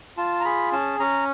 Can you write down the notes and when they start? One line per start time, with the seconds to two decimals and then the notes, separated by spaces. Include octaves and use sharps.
0.17 F4 A5
0.40 A#5
0.45 G#4 B5
0.72 C#4 A5
1.00 C#4 A#5